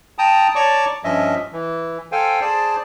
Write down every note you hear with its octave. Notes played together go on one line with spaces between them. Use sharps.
G5 A5 A#5 D#6
C#5 D5 A5 A#5 C#6 D6
G2 F3 C#4 D#5 E5
E3
A4 C5 F5 G5 G#5
G#4 C5 D5 A5